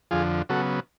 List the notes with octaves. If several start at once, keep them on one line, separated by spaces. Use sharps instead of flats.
F2 D3 F3 F4 G#4
C#3 F#3 B3 F#4 A4